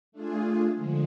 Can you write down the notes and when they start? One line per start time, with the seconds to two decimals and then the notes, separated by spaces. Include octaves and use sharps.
0.12 A3 D4 F4 G#4
0.74 D3 F3 G#3